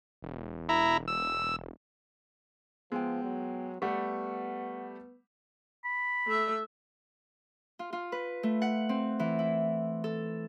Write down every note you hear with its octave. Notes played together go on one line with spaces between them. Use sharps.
E1
E4 A#5
E6
F3 G#3 B3 G5
F#3
G3 A3 B3 F#5 C#6
B5
A3 E5
F4
F4
B4
A3
F#5
C4
E3
E4
A4